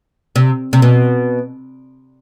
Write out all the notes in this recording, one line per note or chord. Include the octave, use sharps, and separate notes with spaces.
C3
C3
B2